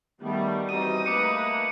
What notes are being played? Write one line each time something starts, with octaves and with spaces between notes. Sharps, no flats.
D#3 G3 A3 B3
E3 C4 D#4 F#4 D#6 D#7
A3 A#3 B4 D6 C#7